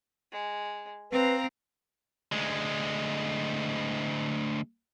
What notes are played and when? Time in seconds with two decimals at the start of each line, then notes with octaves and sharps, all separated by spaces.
0.32 G#3
1.12 C4 B4 F5 A#5
2.32 D2 G#3